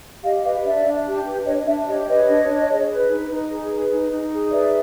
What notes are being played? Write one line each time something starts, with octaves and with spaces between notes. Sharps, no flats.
G4 D#5 F5
B4 D#5 F5
D4 D5 E5
D4
G4
B4
D4 C#5 D#5
D4 D5 E5
G4 C#5 D#5
B4 C#5 D#5
D4
D4
G#4
B4
D#4
D#4
G#4
B4
D#4
D#4
G#4
B4 D5 E5